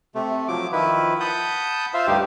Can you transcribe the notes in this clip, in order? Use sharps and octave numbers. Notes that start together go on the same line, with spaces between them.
C3 A3
F3 F#3 D6
D#3 F3 E4 B4
F#5 A5 B5 D#6 G6
F4 C5 E5 F5
D2 G2 D#4 G4